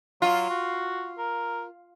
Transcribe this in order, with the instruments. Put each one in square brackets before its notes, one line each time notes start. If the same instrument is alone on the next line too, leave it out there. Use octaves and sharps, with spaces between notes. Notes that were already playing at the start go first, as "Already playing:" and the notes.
[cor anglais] F#3 [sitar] F4
[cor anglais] F#4
A#4